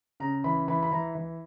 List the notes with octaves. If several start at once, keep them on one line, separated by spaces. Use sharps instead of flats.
C#3 A#5
E3 B5
E3 B5
B5
E3 A#5
E3